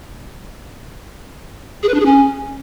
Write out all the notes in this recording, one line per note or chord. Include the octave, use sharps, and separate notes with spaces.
G#4
B4
D4
G#4
C#4